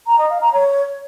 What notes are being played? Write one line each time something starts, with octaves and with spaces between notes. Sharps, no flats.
A#5
D#5
F5
A#5
C#5